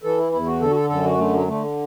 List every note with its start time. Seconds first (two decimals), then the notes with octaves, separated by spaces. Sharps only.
0.03 E3 A4
0.18 E4
0.32 E2 E4
0.47 F#4
0.61 D3 A4
0.71 F#4
0.75 A4
0.90 F#2 A4
1.04 F#4
1.18 D3 A3
1.33 F#3
1.47 D3 A3